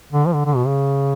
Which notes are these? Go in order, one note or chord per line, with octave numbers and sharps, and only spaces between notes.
D3
F3
D3
D3
B2
C#3